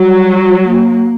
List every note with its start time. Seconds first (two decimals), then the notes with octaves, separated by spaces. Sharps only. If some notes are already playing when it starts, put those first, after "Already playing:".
Already playing: F#3 G3
0.67 A#3